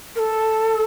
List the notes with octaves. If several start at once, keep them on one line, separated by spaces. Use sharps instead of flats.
A#4
A4